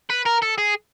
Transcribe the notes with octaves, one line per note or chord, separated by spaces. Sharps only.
B4
A#4
A4
G#4